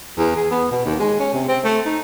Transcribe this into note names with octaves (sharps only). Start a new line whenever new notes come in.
E2
G#4
B3
B2
D#2
G#3
C#4
C3
C4
A3
D#4